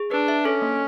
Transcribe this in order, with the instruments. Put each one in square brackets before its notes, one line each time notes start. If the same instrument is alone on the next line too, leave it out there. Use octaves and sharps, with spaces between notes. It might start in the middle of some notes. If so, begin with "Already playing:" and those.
Already playing: [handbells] G#4
[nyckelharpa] D4 [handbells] B4
[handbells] E5
[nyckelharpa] C#4 [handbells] A4
[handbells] A#3